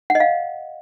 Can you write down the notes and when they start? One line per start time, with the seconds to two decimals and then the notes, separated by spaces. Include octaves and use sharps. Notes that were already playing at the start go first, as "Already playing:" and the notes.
0.10 F#5
0.15 D#5
0.20 F5